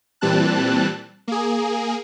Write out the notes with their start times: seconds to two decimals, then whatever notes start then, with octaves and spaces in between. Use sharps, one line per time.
0.21 A#2 E3 G3 C4 A5 F#6
1.28 A#3 G#4